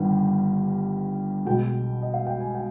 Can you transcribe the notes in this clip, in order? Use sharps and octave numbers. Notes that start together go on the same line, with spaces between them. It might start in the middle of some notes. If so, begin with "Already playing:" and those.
Already playing: G1 G2 D#3
B1 B2 G#3 G5
D#5
F5
G5
G#5
G5